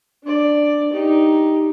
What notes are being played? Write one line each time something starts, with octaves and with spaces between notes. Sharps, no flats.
D4 D5
D#4 G4